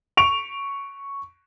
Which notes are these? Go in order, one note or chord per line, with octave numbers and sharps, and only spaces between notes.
C#6 D7 F7